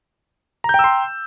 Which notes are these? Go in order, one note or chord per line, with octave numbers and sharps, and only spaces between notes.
G5 A#5 C6 E6 G6